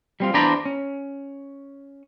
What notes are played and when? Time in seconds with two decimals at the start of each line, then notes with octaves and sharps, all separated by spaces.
0.20 G3 C4 F4
0.34 E2 D4 C5 D5 A#5 B5
0.65 C#4